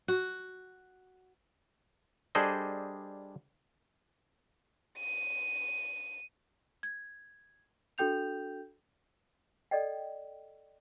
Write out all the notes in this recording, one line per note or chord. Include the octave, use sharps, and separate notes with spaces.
F#4
G3 D4 G#4 A4 C5 D#5
D#7
G#6
D4 F#4 A4 G5 G6 F7
A4 D5 D#5 G5